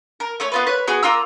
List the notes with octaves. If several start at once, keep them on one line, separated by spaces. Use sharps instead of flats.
A#4
A3 C#4 C#5
B3 F4 B4
B4 C#5 F#6
B3 F#4 G#4
A#3 F4 A#5 E6